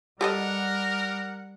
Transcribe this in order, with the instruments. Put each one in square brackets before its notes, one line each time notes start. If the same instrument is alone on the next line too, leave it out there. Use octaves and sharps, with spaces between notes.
[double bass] G3 [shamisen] G4 A4 D#5 [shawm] A#4 [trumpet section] F#5